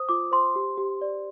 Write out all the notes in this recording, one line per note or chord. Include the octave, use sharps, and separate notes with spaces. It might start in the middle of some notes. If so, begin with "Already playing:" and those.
Already playing: C5 D#6
F4 D6
C5 C6
G4
G4
D5